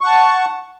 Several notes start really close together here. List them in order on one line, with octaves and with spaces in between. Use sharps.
C#6 F#5 A5